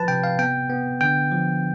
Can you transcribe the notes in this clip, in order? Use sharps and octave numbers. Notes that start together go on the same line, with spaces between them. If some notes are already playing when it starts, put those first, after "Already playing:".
Already playing: F3 B4 A5
C3 G5
F5
B3 G5
B3
D3 G5
F3